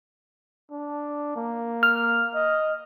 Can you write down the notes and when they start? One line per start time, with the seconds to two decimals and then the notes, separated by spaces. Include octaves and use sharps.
0.72 D4
1.36 A#3
1.83 F6
2.34 D#5